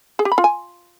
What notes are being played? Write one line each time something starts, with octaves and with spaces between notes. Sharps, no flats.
G#4
G4
B5
F4
G#5